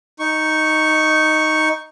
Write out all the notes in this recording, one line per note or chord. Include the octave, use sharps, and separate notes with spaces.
D#4 C#6